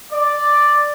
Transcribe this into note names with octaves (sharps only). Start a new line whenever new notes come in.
D5